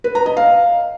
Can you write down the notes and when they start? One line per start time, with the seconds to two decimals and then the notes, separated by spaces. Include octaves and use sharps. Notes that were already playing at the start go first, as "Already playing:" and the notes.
0.04 B4
0.15 A#5
0.26 D#5
0.37 F5